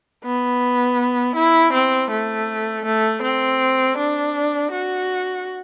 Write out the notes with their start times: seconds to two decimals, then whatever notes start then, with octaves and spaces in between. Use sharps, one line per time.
0.25 B3
1.36 E4
1.73 C4
2.11 A3
2.85 A3
3.22 C4
3.97 D4
4.72 F#4